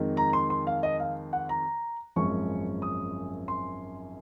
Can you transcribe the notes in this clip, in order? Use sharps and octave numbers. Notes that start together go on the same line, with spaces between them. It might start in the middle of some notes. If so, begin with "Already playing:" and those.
Already playing: F2 D#3 G#3
A#5
C6
C6
F5
D#5
F5
F#5
A#5
G#1 F#2 F3 G#3 C#4 C#6
D#6
C6